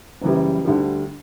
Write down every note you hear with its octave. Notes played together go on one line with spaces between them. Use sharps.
F#1 F#2 C#3 E3 G3
D2 D3 G3